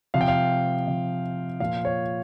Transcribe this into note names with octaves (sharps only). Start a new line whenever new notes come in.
C3 F3 F5
G5
F5
C3 F3
A#2 F3 F5
C#5